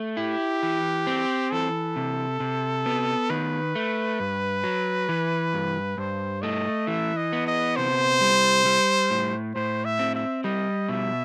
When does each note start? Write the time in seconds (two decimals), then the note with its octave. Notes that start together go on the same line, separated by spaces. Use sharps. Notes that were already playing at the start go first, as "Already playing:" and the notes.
Already playing: A3
0.17 E4 G4
0.63 E3
1.07 C4
1.52 E3 A4
1.96 C3
2.40 C3
2.86 B3
3.30 D#3 B4
3.75 A3
4.20 G2
4.64 F#3
5.09 E3
5.54 G2
5.98 G2 C5
6.42 A3 D#5
6.87 E3 E5
7.16 D#5
7.33 B3
7.47 D#5
7.76 C3 C5
8.21 G3
8.65 G3
9.11 A2
9.55 A2 C5
9.85 E5
9.99 C4
10.15 E5
10.44 G3 D#5
10.89 B2 E5